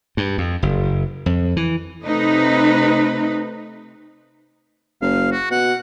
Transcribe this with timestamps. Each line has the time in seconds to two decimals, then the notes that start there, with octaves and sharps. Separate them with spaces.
0.17 G2
0.38 F2
0.62 F#1
1.26 F2
1.57 E3
2.02 C3 A3 D#4 B4
5.02 F#1 F5
5.31 F#4
5.51 B2 F#5